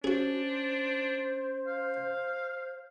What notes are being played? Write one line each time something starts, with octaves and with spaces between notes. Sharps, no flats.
C#4 D4 F#4 G#4 C5
F5